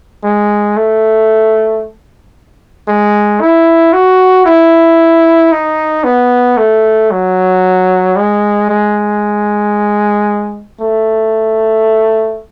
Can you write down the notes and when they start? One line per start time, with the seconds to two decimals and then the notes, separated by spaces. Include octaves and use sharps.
0.24 G#3
0.77 A3
2.88 G#3
3.41 E4
3.93 F#4
4.46 E4
5.52 D#4
6.04 B3
6.57 A3
7.11 F#3
8.16 G#3
8.69 G#3
10.80 A3